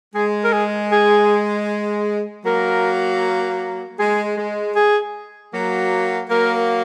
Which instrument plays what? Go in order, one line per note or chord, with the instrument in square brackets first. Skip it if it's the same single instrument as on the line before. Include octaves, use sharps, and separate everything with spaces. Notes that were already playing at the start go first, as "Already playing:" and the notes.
[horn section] G#3 [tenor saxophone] G#4
[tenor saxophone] A#4
G#4
G#4
[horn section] F#3 A#3 [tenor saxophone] A#4
[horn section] G#3 [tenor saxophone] G#4
[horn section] G#3
[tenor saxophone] G#4
[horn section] F#3 A#3
[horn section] F#3 A#3 [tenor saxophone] A#4